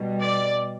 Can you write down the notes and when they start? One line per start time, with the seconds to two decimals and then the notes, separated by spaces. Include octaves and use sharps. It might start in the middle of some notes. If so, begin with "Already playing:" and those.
Already playing: B2 G3
0.21 D5